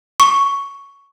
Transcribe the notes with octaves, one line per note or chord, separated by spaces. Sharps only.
C#6